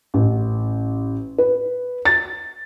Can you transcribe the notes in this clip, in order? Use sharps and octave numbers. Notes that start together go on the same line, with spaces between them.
A1
B4
A6